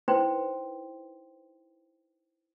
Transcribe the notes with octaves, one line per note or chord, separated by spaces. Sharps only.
D#4 E4 B4 C5 G5 C6